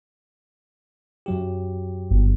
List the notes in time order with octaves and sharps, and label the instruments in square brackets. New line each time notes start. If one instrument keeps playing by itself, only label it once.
[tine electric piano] F#2 F#3 G4
[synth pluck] G1